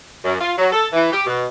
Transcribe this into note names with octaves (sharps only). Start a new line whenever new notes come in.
F#2
F4
F#3
A4
E3
G4
B2